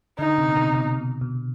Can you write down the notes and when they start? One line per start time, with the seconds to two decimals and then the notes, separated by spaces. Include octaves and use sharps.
0.18 D3 D#4
0.38 C3
0.49 B2
0.57 C3
0.76 B2
0.95 B2
1.21 B2